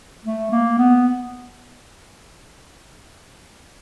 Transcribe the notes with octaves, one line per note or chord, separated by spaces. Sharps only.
A3
A#3
B3